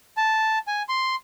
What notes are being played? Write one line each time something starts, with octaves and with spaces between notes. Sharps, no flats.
A5
G#5
C6